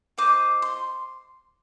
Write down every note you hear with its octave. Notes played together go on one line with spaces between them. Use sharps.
F4 C5 D#5 D6
C6